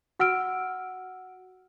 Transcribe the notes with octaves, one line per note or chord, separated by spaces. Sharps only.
F#4 F#5 E6 F6 D7